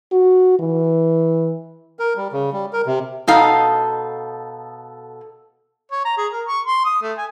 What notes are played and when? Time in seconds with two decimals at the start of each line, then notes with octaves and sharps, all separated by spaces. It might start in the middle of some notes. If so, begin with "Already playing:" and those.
0.12 F#4
0.60 E3
1.99 A#4
2.17 G3
2.32 C#3
2.53 G3
2.73 A#4
2.86 C3
3.28 B2 D#4 A4 F5
5.92 C#5
6.05 A#5
6.17 G#4
6.33 A#4
6.48 C#6
6.67 C6
6.85 D#6
7.02 A3
7.18 G#5